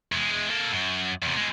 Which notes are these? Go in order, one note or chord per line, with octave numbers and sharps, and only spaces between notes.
E2 G#3
A#3 A4
F#2
E2 C3
B2 G#3